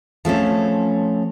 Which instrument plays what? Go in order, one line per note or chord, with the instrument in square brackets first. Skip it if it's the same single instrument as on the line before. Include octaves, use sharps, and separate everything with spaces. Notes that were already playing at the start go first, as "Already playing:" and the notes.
[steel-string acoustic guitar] F3 A3 C4 C#4